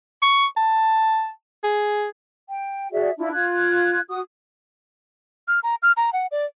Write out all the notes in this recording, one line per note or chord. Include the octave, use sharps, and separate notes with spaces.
C#6
A5
G#4
G5
F#4 G#4 D5 E5
D4 E4 F4
F4 F#6 G#6
F#4 D#6
F6
A#5
F6
A#5
F#5
D5